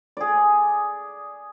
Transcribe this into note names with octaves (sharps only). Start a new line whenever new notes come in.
G#4 D5